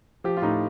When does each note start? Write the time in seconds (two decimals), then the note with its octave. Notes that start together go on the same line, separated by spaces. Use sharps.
0.24 F3 G4
0.37 F4
0.42 A2 D#4